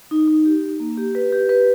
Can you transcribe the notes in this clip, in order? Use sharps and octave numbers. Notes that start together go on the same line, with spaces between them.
D#4
D#4
G4
D#4
A#3
G4
B4
G4
B4